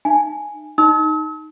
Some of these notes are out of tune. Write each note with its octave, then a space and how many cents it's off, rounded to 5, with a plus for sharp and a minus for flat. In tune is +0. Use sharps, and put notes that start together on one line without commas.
D#4 -35 E5 +40 G#5 +0
D#4 +0 E6 -45